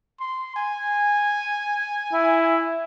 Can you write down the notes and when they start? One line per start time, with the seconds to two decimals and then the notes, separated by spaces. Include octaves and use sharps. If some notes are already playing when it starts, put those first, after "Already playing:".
0.20 C6
0.56 G#5
2.13 E4